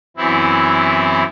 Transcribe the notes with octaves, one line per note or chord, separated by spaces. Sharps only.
F#2 E3 B3 C4 E4